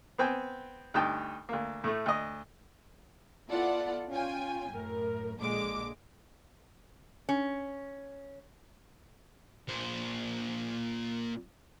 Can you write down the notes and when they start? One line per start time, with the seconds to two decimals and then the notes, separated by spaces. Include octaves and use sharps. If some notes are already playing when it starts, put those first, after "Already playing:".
0.18 B3 C4 G5 G#5
0.94 D2 G2 D#4 G5 A5
1.49 D2 A#3
1.84 A2 A3
2.06 D2 D#5
3.49 B3 E4 F4 A4 D5 F#5
4.10 C#4 F4 G5 G#5
4.71 F#2 A2 A#4
5.40 A#1 A#2 D3 G#3 D6
7.29 C#4
9.68 A#2 C5